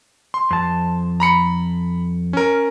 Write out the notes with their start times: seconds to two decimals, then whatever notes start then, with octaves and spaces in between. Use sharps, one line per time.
0.34 C6
0.51 F2 A5
1.20 A#5 B5 C#7
2.33 C#4 A#4